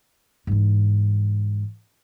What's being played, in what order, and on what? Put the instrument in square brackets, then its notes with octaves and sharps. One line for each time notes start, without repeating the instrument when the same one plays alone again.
[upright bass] G#2 E3